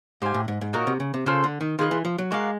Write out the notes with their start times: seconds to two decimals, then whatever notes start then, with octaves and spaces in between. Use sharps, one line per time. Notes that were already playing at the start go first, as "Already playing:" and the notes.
0.22 G#2 G4 C5 F5 G#5
0.34 A2
0.48 G#2
0.61 G#2
0.73 A#2 D#4 F#4 A#4 C#5
0.87 C3
1.00 C#3
1.14 C3
1.26 C#3 F4 A4 C5
1.44 D3
1.61 D#3
1.79 D#3 F4 G#4 B4 D#5
1.91 E3
2.05 F3
2.18 F#3
2.31 G#3 F#4 A#4 D5 F5